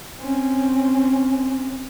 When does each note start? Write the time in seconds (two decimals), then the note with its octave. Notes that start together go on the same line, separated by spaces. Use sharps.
0.20 C4 C#4